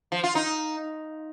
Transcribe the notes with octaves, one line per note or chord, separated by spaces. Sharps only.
F3
F4
D#4